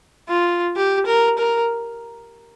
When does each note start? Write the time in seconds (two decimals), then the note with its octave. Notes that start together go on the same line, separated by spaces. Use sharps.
0.29 F4
0.77 G4
1.07 A#4
1.38 A#4